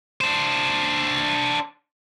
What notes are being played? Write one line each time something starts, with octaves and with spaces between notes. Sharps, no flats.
D4 C5